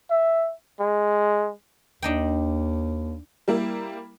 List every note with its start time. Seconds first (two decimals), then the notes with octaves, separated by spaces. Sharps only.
0.10 E5
0.80 G#3
2.02 D#2 D4 D#4 G5
3.48 G3 A#3 E4